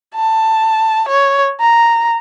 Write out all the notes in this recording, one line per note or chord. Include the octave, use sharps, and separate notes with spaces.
A5
C#5
A#5